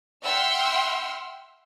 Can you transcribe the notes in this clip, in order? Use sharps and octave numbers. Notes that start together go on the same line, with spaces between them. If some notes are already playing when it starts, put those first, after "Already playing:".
E5 F#5 G5 C6 E6 F6